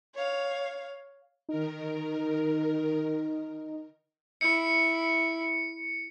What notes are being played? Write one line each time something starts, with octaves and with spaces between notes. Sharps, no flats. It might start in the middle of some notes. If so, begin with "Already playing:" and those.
C#5 F5
D#3 D#4 A#4
E4 C#7